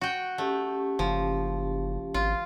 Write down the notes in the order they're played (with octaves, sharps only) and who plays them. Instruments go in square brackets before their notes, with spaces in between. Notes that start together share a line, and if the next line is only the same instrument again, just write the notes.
[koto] F#4 G5
[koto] A3 [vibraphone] C#4 G4
[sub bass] F#1 [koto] F3
[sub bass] G#1 [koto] F4